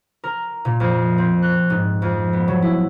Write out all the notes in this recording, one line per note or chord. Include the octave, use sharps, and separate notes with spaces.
A#4
A#2
F2
C4
F#6
G#2
F2
B3
F#3
E4